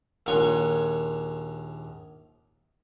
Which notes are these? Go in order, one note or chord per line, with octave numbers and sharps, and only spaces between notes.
A#1 D#2 F4 C#5 G#5